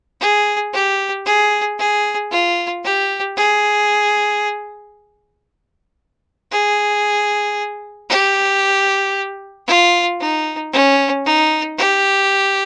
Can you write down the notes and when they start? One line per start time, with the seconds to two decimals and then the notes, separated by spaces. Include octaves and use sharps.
0.21 G#4
0.73 G4
1.26 G#4
1.79 G#4
2.31 F4
2.84 G4
3.37 G#4
6.52 G#4
8.10 G4
9.67 F4
10.20 D#4
10.73 C#4
11.25 D#4
11.78 G4